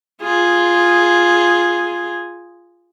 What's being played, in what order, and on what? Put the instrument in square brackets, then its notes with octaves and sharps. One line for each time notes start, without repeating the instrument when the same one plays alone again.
[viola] F4 G#4